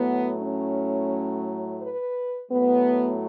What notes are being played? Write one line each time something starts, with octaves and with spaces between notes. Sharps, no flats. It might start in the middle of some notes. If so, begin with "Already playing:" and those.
Already playing: A2 F#3 A3 B3
C#4
B4
A2 F#3 A3 B3